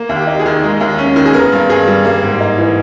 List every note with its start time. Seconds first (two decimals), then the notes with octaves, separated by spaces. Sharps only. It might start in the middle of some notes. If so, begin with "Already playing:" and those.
Already playing: A#3
0.09 D#2
0.16 G4
0.27 D#4
0.39 G#4
0.46 D#3
0.64 G#3
0.80 D#2
0.98 C#4
1.16 D#3
1.26 G#4
1.34 B3 A#4
1.52 G2
1.69 G2 G#4
1.87 G3
2.05 A#3
2.23 G#2
2.40 D#4
2.58 E3